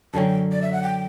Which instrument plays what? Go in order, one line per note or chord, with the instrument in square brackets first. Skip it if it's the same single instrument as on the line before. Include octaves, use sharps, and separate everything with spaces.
[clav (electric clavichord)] F#2 D3 F#3 C#4 [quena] G5 A5
[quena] D5
E5
F#5
G5